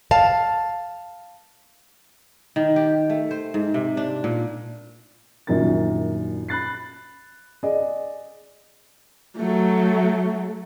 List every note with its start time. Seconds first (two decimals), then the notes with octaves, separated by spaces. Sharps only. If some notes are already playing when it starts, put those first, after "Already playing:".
0.11 F5 A5
2.56 D#3
2.76 G4
3.10 A3
3.31 C5
3.54 G#2
3.74 C3
3.97 D4
4.24 A#2
5.47 A#1 F#2 A#2 D#3 A#4 A6
6.48 B5 F#6 A6 C7
7.63 G#4 D5 D#5
9.37 F#3 A3